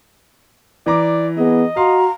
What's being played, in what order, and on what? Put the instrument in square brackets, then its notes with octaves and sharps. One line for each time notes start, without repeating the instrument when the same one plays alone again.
[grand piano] E3 A#5 D6 [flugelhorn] D5
[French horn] B3 [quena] G#4 [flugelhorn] D#5
[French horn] F#4 [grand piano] F5 C6 [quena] A#5